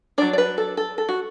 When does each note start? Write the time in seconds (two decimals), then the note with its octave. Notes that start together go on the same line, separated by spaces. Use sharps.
0.18 F#3 D4 D5
0.33 D5
0.38 B4
0.58 A4
0.77 A4
0.98 A4
1.09 F#4